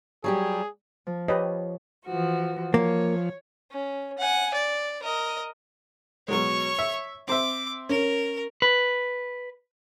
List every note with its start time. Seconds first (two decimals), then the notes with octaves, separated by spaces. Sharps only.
0.24 F#3 G3 G4 G#4
1.07 F3
1.28 G4 B4 C#5 D#5
2.06 E3 F3 F#4
2.74 F3 A#3 C#5
3.71 C#4
4.19 F#5 G#5
4.54 D5
5.03 A#4 D#5
6.28 B2 F#3 G#3 C#5 C#6
6.79 E5
7.28 C4 C5 E5 D6
7.89 C#4 A#4
8.62 B4